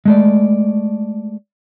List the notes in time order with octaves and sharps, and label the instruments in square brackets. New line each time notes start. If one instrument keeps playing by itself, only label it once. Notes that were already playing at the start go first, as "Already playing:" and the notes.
[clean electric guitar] G#3 A3 D5